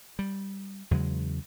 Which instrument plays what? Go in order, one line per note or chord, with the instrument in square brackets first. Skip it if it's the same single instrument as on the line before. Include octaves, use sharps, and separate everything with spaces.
[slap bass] G3
E2 C#3 F#3 G#3